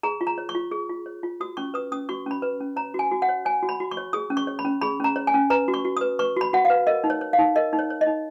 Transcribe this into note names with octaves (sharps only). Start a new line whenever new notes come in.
G#4 A#5
F4
A#5
C#5
C#6
F4
G#4
F4
C#5
F4
F#4 D#6
C#4 C#6
B4 D#6
C#4 D#6
F#4 C#6
C#4 B5
B4
C#4
C#5 A#5
F#4 G#5
F#4
F#5
C#5
C#5 G#5
F#4
B5
F#4
C#6
C#5
G#4 D#6
C#4
C#6
C#5
B5
C#4
G#4 B5
C#4 A#5
C#5
G#5
C#4
B4 A#5
F#4
C#6
F#4
B4 D#6
B4 C#6
F#4 B5
F#4 F#5
F5
B4
A#4 D#5
D#4
C#5
C#5
F5
D#4
A#4 D#5
D#4
C#5
C#5
D#5
D#4